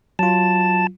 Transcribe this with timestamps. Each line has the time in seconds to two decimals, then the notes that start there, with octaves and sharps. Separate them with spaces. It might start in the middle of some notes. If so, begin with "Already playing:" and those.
0.19 F#3 F4 A5